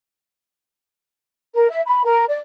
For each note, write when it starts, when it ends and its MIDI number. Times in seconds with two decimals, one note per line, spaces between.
1.55 1.68 70
1.70 1.81 76
1.87 2.02 83
2.04 2.24 70
2.29 2.38 74